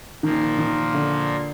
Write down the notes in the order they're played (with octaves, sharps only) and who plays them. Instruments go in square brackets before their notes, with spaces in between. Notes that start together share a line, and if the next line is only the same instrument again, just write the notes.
[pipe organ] A#2 F3 A#3 [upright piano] D#3
[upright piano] D#3
D3